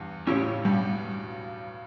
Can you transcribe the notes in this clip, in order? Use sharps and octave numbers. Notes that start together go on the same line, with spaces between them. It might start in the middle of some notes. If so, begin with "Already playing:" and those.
Already playing: E2 G2
A2 C#3 C#4 E4 G4 C#5
G2 B2 G3